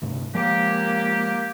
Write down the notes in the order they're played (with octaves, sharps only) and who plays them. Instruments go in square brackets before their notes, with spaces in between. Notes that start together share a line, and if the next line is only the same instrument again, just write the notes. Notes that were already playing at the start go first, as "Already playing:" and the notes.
[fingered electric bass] D2 G2 C3
[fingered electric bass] F3 G#3 [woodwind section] A#3 G4